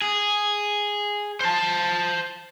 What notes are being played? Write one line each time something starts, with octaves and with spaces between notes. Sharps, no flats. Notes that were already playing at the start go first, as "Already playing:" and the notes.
G#4
C5 A5